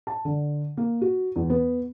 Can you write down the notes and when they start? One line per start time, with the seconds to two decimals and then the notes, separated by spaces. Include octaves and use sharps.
0.07 A5
0.25 D3
0.77 A#3
1.01 F#4
1.36 E2
1.50 B3